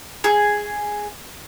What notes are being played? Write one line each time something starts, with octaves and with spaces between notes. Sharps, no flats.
G#4